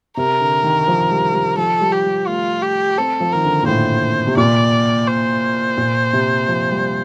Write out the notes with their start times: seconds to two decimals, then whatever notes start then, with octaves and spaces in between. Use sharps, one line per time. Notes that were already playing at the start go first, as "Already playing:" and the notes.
0.17 C3 A#4
0.41 D3
0.64 D#3
0.88 F3
1.11 G3
1.34 G3
1.57 F3 A4
1.81 G3
1.92 G4
2.04 G3
2.27 A3 F4
2.62 G4
2.98 C4 A4
3.20 F3
3.33 D#3 A#4
3.44 D3
3.63 A#2
3.68 A2 C5
4.27 C3
4.37 A#2 D5
5.08 C5
5.78 A#2
6.13 C3
6.48 F3
6.71 G3